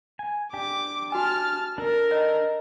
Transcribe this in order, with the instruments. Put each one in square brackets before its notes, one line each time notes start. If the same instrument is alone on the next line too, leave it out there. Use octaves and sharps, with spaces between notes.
[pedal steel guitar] G#5
[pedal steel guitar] D4 G4 [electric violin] D6
[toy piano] F#4 G#5 [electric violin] A5 F6
[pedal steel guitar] D4 A4 [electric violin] A#4
[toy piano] C#5 D#5